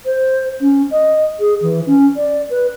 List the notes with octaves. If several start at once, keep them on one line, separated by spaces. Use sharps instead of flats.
C5
C#4
D#5
G#4
E3
C#4
D5
B4